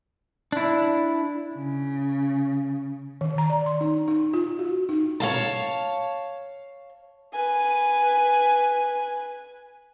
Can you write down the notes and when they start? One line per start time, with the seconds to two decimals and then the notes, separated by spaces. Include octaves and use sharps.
0.52 D4 E4
1.53 C#3
3.21 D#3
3.38 A#5
3.50 D5
3.66 C6
3.81 D#4
4.08 D#4
4.33 F4
4.59 F#4
4.89 D#4
5.20 C#5 F5 A5
7.33 B4 G#5